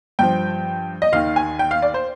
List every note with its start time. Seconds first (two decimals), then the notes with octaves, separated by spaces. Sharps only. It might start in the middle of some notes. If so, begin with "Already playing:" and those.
0.19 G2 F3 G5
1.02 D#5
1.12 D#2 D#3 F5
1.36 G#5
1.59 G5
1.71 F5
1.82 D5
1.94 C5